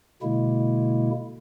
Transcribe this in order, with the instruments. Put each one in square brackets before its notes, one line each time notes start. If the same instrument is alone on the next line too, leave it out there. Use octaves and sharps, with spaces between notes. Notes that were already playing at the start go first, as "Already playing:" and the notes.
[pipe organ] B2 D3 G#3 A#3 E4